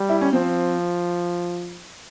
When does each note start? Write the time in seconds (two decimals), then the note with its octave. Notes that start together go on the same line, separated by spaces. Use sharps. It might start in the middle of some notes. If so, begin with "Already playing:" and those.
Already playing: G3
0.09 E4
0.21 C#4
0.33 F3 C4